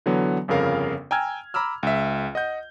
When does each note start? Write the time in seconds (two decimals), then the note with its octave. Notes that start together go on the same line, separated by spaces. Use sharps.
0.06 D3 E3 F#3 B3
0.48 G1 F2 C#3 A#4 F5
1.11 G5 G#5 A#5 E6 F6 G#6
1.54 A#5 B5 D6 E6 F6
1.83 C#2 E5
2.35 D#5 F#5 G6